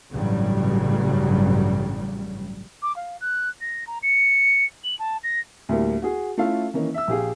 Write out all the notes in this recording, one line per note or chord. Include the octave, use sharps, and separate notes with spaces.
A1 G2 C#3 F#3 G3
D6
F5
F#6
A#6
A#5
C#7
F#7
A5
A#6
D2 A2 G3 A#3
F#4 G#4
A3 C#4 E4 F4 A4 F5
D#3 E3 A#3 C#4 D#4
E5 E6
A#1 G4 G#4 F5